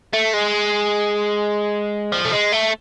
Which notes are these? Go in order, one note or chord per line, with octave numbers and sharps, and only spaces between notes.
A3
G#3
F3
A3
G#3
A3